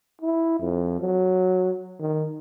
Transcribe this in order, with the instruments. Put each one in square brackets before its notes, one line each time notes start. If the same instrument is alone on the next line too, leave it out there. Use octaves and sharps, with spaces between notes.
[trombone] E4
F2
F#3
D#3